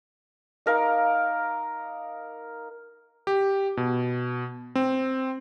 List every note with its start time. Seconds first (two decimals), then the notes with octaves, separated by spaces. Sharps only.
0.66 D#4 A#4 F5 D6
3.27 G4
3.77 B2
4.75 C4